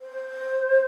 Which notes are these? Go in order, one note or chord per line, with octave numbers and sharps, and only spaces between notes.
C5